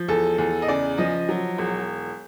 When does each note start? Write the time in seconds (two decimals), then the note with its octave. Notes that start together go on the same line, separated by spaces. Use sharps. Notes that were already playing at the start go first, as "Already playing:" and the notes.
Already playing: F3
0.08 E2 A4
0.38 E2
0.62 D#5
0.68 C#3 D5
0.98 F3 D#5
1.29 F#3
1.58 E1